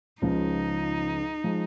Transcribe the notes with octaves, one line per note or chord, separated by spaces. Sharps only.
C#2 C#3 F3 D#4
F3 G#3